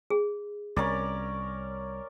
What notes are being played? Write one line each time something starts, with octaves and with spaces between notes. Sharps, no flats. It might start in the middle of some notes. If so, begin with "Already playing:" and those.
G#4
C2 C#4 A#4 D5